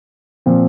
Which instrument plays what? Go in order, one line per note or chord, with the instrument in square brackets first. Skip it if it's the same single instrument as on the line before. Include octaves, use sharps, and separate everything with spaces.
[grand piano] A#2 F3 C4